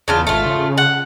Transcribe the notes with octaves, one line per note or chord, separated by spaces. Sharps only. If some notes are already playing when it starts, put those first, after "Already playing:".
E2 C#3 D4 F4
G#1 A3 F4
C#3
F#5